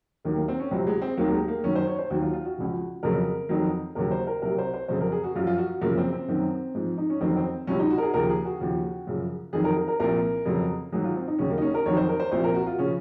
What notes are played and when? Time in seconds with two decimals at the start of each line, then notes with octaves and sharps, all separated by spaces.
0.25 D#2 D#3 F#3 A#3
0.36 A#3
0.48 C4
0.59 C#4
0.71 C#2 C3 F#3 C4
0.87 G#3
1.02 C4
1.17 D#2 D#3 F#3 A#3
1.33 G#3
1.48 A#3
1.64 F#2 D#3 F#3 C#4
1.75 C5
1.87 C#5
1.99 C5
2.10 D#2 D#3 F#3 F#4
2.22 F4
2.33 F4
2.45 F#4
2.57 C#2 C#3 F3
3.03 F2 C#3 F#3 A#4
3.49 F2 D#3 F#3
3.95 D#2 C#3 F#3 A#4
4.11 C5
4.27 A#4
4.42 C2 C3 F#3 A#4
4.58 C5
4.74 C5
4.88 F2 C#3 F#3 C5
5.01 A#4
5.12 G#4
5.24 F#4
5.35 F#2 F3 F4
5.47 F4
5.58 F#4
5.81 F#2 C#3 F3 A#3
5.97 C4
6.12 C4
6.28 F#2 D#3 F#3
6.75 G#2 F3
6.98 D#4
7.10 C#4
7.21 F2 D#3 F#3 C4
7.37 C4
7.67 C#2 C3 F#3 C#4
7.79 D#4
7.90 F#4
7.98 A#4
8.02 G#4
8.14 D#2 C#3 F3 A#4
8.29 G#4
8.45 F#4
8.60 D#2 C#3 F3
9.07 F#2 C#3 F3
9.53 F2 D#3 F#3 G#4
9.64 A#4
9.77 A#4
9.88 A#4
10.00 C2 A#2 F3 A#4
10.45 F2 C#3 F#3
10.92 G#2 D#3 F#3 G#4
11.04 F4
11.16 C4
11.27 D#4
11.38 D#2 C#3 F#3 C#4
11.50 A#3
11.58 D#4
11.62 C#4
11.74 A#4
11.86 F2 D#3 F#3 C#5
11.97 C5
12.08 A#4
12.19 C5
12.31 C2 A#2 F3 C5
12.44 A#4
12.55 F#4
12.67 F4
12.78 C#3 F3 C#4